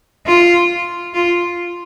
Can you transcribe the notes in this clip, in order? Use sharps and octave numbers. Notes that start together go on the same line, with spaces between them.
F4
F4